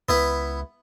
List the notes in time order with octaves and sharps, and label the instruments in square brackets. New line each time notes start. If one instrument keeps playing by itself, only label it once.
[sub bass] C#2 [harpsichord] B3 E4 B4